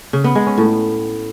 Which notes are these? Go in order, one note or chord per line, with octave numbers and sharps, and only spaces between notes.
C#3
B3
G#3
C#4
A2